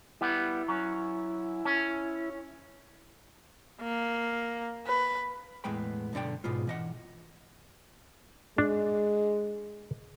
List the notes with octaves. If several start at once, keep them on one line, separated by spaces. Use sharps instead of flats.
G3 B3 E4
F#3 C#4
C#4
A#3
B4
E2 A2 G#3 B3 G5 B5
B1 G2 D3 D5 G5
G#2 B2 G#3 B3 F4
E3 D#5 F#5
G#3 D4